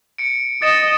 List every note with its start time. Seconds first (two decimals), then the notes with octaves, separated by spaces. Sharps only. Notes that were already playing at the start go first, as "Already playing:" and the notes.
0.18 C#7 D7
0.62 D#5 A6 C#7 E7